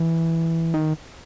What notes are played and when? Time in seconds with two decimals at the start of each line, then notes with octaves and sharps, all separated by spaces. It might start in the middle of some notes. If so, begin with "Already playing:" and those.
Already playing: E3
0.74 D#3